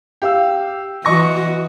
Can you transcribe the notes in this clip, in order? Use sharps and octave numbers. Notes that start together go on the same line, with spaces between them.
G4 F5 E6
E3 F#4 D#5 C#6 A#6